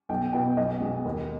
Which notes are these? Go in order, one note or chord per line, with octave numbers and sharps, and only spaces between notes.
B1 G5
B2 B3 G5
B1 D#5
B2 G#3
D#2